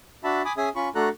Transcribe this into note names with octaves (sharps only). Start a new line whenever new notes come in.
D4 F#4 E5 A5 B5
G#5 B5 D6 D#6
C#4 G#4 E5 G#5 D#6
C#4 F4 B5 C#6
A3 D4 F#4 A4 A#5 F#6